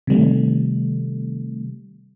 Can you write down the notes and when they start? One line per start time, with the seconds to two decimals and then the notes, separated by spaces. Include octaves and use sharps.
0.07 C3 D#3 G3 A3